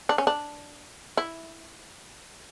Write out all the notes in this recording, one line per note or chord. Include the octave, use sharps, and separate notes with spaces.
D4
C#4
D4
E4